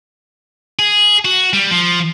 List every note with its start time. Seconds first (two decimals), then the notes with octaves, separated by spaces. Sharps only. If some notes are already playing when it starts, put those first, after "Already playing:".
0.79 G#4
1.25 F#4
1.53 G3
1.71 F3